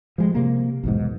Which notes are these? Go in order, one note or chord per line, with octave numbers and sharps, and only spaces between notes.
F3 G3 G#3
C3 A#3
B1 E2 G#2